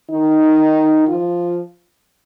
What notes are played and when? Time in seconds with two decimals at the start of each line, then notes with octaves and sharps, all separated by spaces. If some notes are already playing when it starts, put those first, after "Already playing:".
0.11 D#3 D#4
1.08 F3 F4